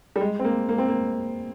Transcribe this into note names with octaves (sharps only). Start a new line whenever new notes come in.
G3
G#3
C4
A#3
A#3
C4
A#3